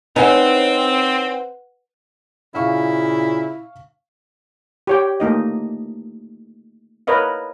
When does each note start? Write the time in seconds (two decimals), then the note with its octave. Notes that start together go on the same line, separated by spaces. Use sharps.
0.16 C4 C#4 D#4 B4 F#5
2.55 A#2 C#3 E4 F5 C#6
4.87 G4 C#5 G5
5.20 A3 A#3 D#4 D#5
7.07 A#4 B4 C#5 D#5 F5